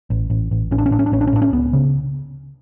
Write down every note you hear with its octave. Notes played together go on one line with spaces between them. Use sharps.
A1
A1
A1
A1 C#4
D4
C#4
A2 D4
C#4
D4
A1 C#4
D4
C#4
A2 D4
C#4
C#2 B3
C#3